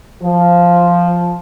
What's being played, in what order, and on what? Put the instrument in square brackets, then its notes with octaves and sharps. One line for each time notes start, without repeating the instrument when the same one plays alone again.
[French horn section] F3